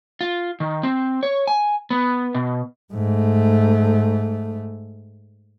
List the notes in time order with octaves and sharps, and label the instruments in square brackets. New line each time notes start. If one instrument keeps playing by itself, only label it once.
[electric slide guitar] F4
D#3
C4
C#5
G#5
B3
B2
[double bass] G#2 A3